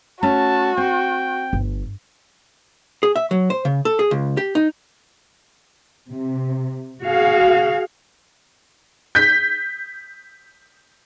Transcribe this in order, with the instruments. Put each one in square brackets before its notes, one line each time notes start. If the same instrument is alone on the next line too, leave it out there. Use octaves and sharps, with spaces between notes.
[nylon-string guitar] A3 C#4 [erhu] F#4 [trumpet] A5
[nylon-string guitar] C4 [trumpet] G5
[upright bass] G1
[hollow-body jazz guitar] G#4
E5
F#3
C5
C#3
A4
G#4
C#2
G4
D#4
[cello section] C3
F#4 G#4 F5
[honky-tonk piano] G6 B6